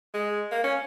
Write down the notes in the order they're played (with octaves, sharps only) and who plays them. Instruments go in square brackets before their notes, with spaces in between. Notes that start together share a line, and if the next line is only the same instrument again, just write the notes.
[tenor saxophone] G#3
A#3
C#4